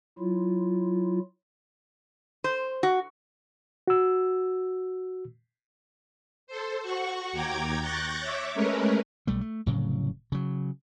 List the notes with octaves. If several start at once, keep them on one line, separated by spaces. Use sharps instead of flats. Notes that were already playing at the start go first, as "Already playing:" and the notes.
F#3 E4 F4
C5
F#4
F#4 E6
A4 C5
F#4 F#5 C#6
D#2 G5 A#5 D6 G#6
C#6 F#6 G6 A6 A#6
C#5 E5 D6
G#3 A3 C#4 A#4 B4
B1 G3 A3
A3
F1 A2 C#3 F#3
C#3 F#3